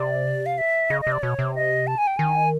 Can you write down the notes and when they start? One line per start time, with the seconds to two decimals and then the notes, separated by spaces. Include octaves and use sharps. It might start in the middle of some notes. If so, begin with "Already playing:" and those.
Already playing: C3 D5
0.46 F5
0.58 E5
0.90 C#3 D#5
1.01 D#5
1.07 C3
1.12 D5
1.22 B2 C#5
1.39 C3
1.55 D#5
1.87 A5
1.98 G#5
2.07 G5
2.17 D#3 G#5